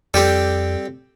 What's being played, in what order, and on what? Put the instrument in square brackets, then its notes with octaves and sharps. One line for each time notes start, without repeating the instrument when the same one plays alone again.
[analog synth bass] F2 [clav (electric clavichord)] G3 [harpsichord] C4 G4 A4